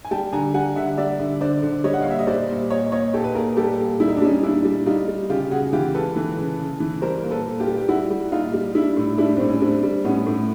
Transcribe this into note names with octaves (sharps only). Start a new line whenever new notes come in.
G#5
G3 G5 A5
D3 G#5 A#5
G3 F#5 G#5
D3 E5 F#5
G3 D5 E5
D3
D3 C5 D5
D3
G3 C#5 D#5
F#5
A#2 F5
E5
D#5
G3 C5 D5
A#2
A#2 C#5 D#5
A#2 C#5 D#5
A#2 G4 A4
B4
A#2 G#4 A#4
G3 G4 A4
A#2
G3 E4
D#4
D4
G3 C#4 D#4
A#2 D4 E4
G3
G3 D#4 F4
G3
C#3 F4 G4
C#3 F#4 G#4
E3 F4 G4
G#3 A4 B4
E3
C#3
C#3
E3
G3 A#4 C5
A#2
A4 B4
A#2
F4 G4
G3
G4
G3 E4 F#4
G3
A#2 D#4 F4
G3
G3 D4 E4
A2
G3 D4 E4
A2 C4
C#4
G3 C4 D4
G3
A2 B3 C#4
A2